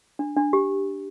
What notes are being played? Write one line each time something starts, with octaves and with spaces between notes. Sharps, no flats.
D4
D4
G4